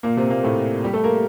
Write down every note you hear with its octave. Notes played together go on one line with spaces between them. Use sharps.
A#2 A#3
C3 C4
A#2 A#3
A2 A3
G3 G4
A3 A4
A#3 A#4